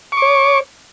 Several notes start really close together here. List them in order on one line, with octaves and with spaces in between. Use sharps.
C#6 D6 C#5